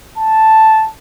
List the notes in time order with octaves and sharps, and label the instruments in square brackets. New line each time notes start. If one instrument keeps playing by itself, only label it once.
[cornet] A5